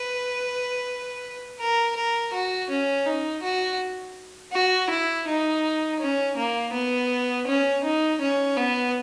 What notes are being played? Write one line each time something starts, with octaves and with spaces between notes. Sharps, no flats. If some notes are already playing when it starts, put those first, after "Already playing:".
Already playing: B4
A#4
A#4
F#4
C#4
D#4
F#4
F#4
E4
D#4
C#4
A#3
B3
C#4
D#4
C#4
B3